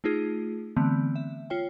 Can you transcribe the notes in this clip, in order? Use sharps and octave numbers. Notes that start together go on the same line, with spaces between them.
A3 D#4 F4 G#4
D3 E3 A3 B3 C4
E5
F4 C#5 G5